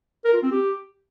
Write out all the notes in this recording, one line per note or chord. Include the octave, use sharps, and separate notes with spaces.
A#4
F4
C4
G4